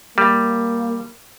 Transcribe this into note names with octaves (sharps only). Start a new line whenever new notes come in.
G3 A#3